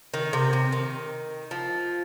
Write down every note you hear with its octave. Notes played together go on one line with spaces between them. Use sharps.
D#3
C3
C3
D#3
F3